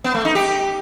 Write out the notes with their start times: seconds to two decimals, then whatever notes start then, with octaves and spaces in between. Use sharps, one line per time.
0.04 B3
0.15 A3
0.25 D#4
0.35 G4